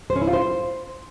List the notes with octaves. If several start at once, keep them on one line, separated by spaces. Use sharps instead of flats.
C5
C#4
E4
F4
C5